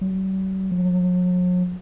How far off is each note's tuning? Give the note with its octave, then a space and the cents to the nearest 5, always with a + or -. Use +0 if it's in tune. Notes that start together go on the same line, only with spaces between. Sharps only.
F#3 +45
F#3 -45